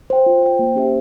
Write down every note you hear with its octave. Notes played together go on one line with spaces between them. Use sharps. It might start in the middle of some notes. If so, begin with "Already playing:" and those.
C5 G5
F4
C5 G5
A#3
C#4 G4 C5 E5